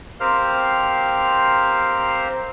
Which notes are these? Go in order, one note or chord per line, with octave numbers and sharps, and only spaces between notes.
C4 G4 A#4 C5 F5 F6